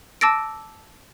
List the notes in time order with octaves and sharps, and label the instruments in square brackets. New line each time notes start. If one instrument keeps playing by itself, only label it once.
[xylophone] A5 D6 E6 A6 A#6 D7